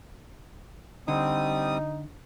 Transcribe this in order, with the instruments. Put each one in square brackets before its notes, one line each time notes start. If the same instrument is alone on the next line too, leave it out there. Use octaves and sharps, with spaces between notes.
[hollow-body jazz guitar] D3 [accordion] G3 C4 D#6 [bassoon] D#4